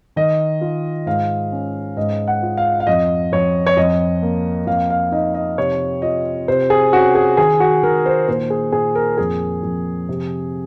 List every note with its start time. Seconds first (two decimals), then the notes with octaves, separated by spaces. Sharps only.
0.16 D#3 D#5
0.61 F4
1.06 G#2 F5
1.52 C#4
1.97 G#2 D#5
2.28 F#5
2.43 F4
2.57 F5
2.80 F5
2.87 F2 D#5
3.32 F2 C#5
3.67 C#5
3.77 F2 D#5
4.22 A#3
4.67 F2 F5
4.90 F5
5.12 D#4 D#5
5.34 D#5
5.58 C3 C#5
6.02 F4 D#5
6.48 C3 C5
6.70 G#4
6.93 C#4 F#4
7.15 G#4
7.37 D#3 G#4
7.60 F#4
7.83 D#3 A#4
8.06 C5
8.28 A#2 C5
8.50 G#4
8.72 A#2 G#4
8.95 A#4
9.18 F2 G#4
9.63 F2
10.09 C3